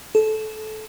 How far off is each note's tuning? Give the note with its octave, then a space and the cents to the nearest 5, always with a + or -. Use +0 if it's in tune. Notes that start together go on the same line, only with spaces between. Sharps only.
A4 -20